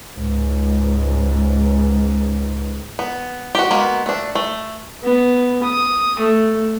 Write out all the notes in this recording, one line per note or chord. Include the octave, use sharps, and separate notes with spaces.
C#2 G#2
B3
F#4 G4
G#3 A#3 B3 F#4
A3 D4
A3
B3
D#6
A3